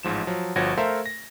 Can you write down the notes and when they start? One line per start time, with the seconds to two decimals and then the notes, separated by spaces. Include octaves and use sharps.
0.03 A1 G#2 F3 E7
0.27 F3 F#3
0.56 G1 F3 F#4 C#5 G#6 A#6
0.77 A3 A4 A#4 C5 E5 F5
1.06 A#6